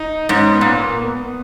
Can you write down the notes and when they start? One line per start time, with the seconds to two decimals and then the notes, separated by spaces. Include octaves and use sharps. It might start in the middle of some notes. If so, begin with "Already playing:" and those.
Already playing: D#4
0.29 G#2 C#4
0.52 B3
0.61 A#2
0.77 A#3
1.01 B3
1.24 B3